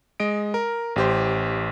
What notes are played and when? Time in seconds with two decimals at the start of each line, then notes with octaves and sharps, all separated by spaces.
0.20 G#3 D#5 D7
0.54 A#4
0.96 A1 G4 C5